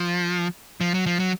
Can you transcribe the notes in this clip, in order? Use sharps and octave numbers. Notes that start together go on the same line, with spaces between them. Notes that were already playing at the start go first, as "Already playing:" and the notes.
Already playing: F3
F3
F#3
F3
F#3